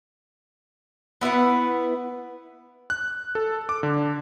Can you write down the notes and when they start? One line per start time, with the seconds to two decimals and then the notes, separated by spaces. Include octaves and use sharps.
1.21 B3 E4 B4 F#5
2.90 F#6
3.35 A4
3.69 D6
3.83 D3